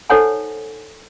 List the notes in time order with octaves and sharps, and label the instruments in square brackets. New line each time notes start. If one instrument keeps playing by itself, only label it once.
[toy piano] D#4 A4 C5 C#5 F#5 G#5